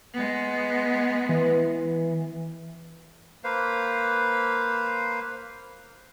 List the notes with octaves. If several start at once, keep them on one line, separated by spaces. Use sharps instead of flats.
G#3 B3
E3
A#3 B4 C5 F5